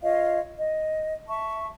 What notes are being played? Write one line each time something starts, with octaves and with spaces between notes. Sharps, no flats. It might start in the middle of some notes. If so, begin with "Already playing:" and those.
F4 C#5 D#5 F5
D#5
E5 A5 C#6